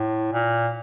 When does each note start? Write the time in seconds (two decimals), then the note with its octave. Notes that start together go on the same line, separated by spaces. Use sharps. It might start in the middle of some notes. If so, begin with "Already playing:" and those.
Already playing: A2
0.33 A#2